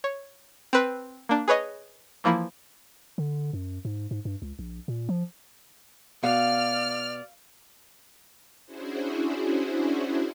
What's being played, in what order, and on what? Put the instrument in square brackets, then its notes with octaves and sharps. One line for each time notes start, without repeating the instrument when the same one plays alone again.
[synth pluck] C#5
C4 B4
A#3 D4
G#4 B4 C#5 D#5
E3 F3 A#3 E4
[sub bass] D3
F#2
G#2
G#2
G2
C#2
A#1
A#2
F3
[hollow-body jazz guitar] B2 [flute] D5 [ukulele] F5 [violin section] F6
[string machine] C#4 D4 E4 F#4 G#4 C5